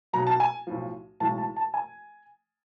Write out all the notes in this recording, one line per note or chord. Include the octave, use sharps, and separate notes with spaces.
B1 B2 F#3 A#5
A5
G#5
B1 A2 F3
B1 A2 E3 G#3 A5
A5
A5
G#5